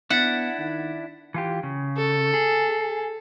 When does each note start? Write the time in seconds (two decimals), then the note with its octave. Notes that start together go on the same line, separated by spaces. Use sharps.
0.10 B3 D4 E4 F#5 A6 B6 E7
0.59 D#3
1.34 E3 F4 G4
1.63 C#3
1.97 A4
2.34 G#4